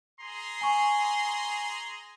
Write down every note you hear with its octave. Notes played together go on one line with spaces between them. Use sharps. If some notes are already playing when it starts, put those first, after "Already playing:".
G#4 A#5 C6
G#5 C#6